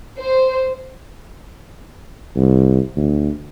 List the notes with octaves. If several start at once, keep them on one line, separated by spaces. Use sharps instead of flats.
C5
C2
D2